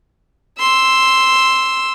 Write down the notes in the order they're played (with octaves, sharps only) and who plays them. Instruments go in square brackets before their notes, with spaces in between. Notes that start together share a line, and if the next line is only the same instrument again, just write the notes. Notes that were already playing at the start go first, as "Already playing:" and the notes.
[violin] C6 E6